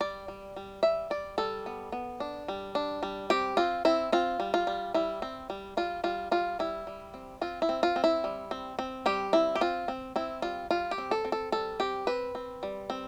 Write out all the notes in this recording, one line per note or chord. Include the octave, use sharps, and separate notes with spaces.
G3 D5
G3
G3
G3 E5
G3 D5
G3 A4
B3
B3
D4
G3
D4
G3
C4 G4
C4 F4
C4 E4
C4 F4
G3
F4
G3
G3 E4
C4
G3
G3 F4
G3 F4
G3 F4
G3 E4
G3
C4
C4 F4
E4
C4
F4
C4
E4
G3
C4
C4
G3 G4
C4 E4
G4
C4 F4
C4
C4 E4
G3 F4
G3 F4
G4
C4
A4
C4
A4
G3 A4
C4 G4
C4 B4
C4
G3
C4